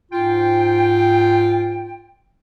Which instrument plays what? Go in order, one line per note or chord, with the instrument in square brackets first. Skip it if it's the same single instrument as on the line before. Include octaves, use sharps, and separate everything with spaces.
[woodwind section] G#2 F4 G5